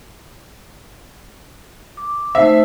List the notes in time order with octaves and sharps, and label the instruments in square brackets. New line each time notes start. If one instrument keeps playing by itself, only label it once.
[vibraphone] D6
[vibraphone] A3 D#4 C5 [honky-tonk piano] E5